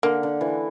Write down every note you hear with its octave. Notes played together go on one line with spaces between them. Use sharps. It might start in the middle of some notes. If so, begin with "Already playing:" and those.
D3 A#3
D3
E3